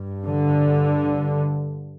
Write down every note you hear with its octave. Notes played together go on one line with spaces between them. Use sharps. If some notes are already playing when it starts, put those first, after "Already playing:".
Already playing: G2
D3